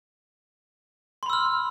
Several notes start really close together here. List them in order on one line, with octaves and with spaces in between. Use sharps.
C6 B5 E6 F6